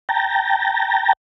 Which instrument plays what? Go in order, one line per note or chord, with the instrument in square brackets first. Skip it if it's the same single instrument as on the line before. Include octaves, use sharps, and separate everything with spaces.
[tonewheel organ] G5 A5 A#5